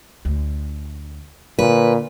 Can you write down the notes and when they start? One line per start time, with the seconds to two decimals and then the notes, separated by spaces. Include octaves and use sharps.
0.25 D2
1.59 A#2 D3 B4